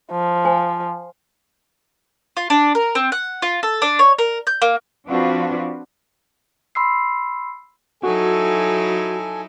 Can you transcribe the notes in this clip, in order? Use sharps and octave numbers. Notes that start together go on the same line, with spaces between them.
F3
C5 G#5
F4
D4
A#4
C4
F#5
F4
A4
D4
C#5
A#4
G6
A#3
F3 C4 D4 F4 F#4 B4
B5 C6 E6 C7
F#3 D#4 E4 F#4 A4 G#5